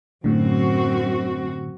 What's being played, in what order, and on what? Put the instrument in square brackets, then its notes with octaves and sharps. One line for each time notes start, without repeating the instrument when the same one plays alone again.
[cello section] F#2 C4 F#4 [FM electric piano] A2 D3